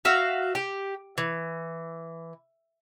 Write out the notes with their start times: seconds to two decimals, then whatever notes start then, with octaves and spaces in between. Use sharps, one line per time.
0.05 F#4 E5 F5
0.55 G4
1.18 E3